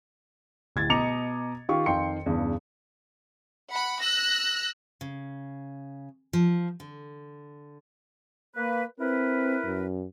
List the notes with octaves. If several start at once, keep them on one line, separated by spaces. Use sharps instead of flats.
D1 G#6 A6
B2 D#5 A#5 D6 C#7 F7
D#3 F4 G4 C#6
F2 D#3 F5 G5 C6 C#7
E2 G2 C#3
F#5 B5
E6 F#6 A#6
C#3
F3
D3
A#3 B4
C4 E4 A#4 B4
F#2